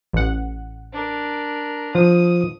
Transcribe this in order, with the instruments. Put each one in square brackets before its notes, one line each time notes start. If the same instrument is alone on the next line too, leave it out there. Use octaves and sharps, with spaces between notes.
[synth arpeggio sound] A1 F#5
[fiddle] D4 A#4
[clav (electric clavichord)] F3 [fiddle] D#6